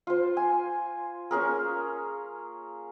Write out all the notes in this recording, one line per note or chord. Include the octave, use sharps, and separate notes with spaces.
F4 C5
G#5
A#3 C#4 G#4 A#4